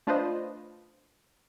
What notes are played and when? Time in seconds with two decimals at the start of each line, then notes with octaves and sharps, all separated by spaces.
0.07 A3 D4 F4 B4 C5 D#5